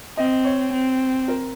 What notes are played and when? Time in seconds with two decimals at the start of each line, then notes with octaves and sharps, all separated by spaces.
0.17 C4 D#5
0.45 C#5
0.73 C4
1.28 A#4